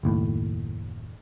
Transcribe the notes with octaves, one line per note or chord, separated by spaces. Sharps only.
F#1 D#2 A2